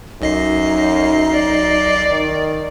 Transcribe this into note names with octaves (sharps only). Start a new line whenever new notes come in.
B1 F#2 D#4 D#5 C7
D5
D#3